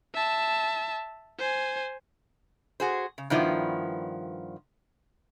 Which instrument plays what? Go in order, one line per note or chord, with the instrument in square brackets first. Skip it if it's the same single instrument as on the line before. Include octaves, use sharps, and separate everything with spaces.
[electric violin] E5 A5
C5 G#5
[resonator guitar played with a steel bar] F#4 G#4 C5
C#3
G2 D#3 F3 B3 E4